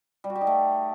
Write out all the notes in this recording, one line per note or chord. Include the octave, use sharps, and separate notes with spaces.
G3
F#4
G4
D#4
A3